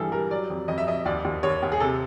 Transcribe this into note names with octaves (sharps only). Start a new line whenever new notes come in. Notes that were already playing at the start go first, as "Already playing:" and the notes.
Already playing: G2 E3 G3 G#4 A4
G3 A#4
F#3 D5
F2
F2 D#5
E5
F2 D#5
D#2 D5
D#2
D#2 C#5
D#2
G#4
C3 A4